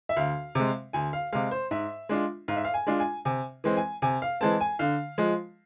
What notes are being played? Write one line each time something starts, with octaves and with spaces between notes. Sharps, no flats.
E5
D2 F5
C3 G#3
D2 G#5
F5
C3 G#3 F5
C5
G#2 E5
G#3 D4 F4
G#2 F5
E5
F5
G#5
G#3 D4 F4
G#5
C3 G#5
E3 G#3 C4
G#5
C3 G#5
F5
E3 G#3 C4 A5
G#5
D3 F5
F3 G#3